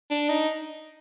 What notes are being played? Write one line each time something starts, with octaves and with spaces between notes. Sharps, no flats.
D4
D#4